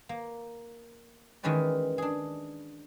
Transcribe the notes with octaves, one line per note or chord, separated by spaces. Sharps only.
A#3
D#3 E3 G#3 C#4 B4 D5
D4 G#4